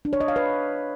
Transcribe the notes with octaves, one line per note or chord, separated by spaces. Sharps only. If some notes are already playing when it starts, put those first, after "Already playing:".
D4
C#5
D#5
F5
B4